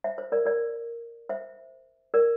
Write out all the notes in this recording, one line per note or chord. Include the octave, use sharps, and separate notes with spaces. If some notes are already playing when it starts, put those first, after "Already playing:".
C5 E5
C5
A#4 D5
A#4 D5
C5 E5
A#4 D5